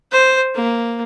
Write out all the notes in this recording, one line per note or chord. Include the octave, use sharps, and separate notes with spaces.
C5
A#3